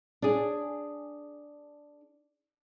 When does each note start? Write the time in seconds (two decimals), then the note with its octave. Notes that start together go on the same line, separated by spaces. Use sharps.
0.22 D4 G#4